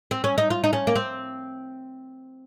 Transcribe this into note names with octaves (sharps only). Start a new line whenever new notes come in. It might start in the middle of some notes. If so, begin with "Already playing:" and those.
C4
C#4
D#4
F4
D#4
C#4
A#3
C4